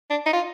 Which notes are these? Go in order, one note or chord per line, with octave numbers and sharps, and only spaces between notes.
D4
D#4
F4